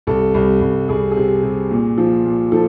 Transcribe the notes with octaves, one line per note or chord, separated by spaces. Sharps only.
C2 A4
C2
C2
C2 G#4
G#4
C3
C3
A#2
F3
A#2
F3 A4